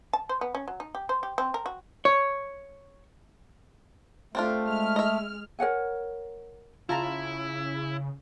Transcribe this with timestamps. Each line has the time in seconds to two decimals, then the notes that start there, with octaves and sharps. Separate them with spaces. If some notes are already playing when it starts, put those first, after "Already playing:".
0.13 A5
0.29 C5
0.41 B3
0.55 C#4
0.68 F#3
0.80 D#4
0.95 G4
1.09 C5
1.23 G4
1.38 C4
1.54 A#4
1.66 F#4
2.05 C#5
4.35 A3 C4 D4 F4
4.64 G#3 F6
4.96 D#5 E5
5.59 A#4 C#5 F#5 G#5
6.89 C#3 E4 F4 A5 A#5